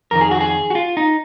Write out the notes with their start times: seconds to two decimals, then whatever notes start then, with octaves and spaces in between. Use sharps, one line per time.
0.11 F2 D#3 A#4
0.21 G#4
0.31 F#4
0.41 G#4
0.70 F#4
0.75 F4
0.97 D#4